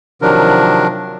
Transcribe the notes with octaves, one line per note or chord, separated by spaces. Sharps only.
C3 D#3 F3 F#3 D4 A#4